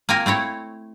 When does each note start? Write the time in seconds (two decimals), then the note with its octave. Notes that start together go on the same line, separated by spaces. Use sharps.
0.09 A#3 C4 F4 A#4 G#5
0.26 A3 C4 E4 C#5